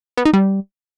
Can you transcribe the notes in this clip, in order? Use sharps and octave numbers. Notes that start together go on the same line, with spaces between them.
B3
D#4
G3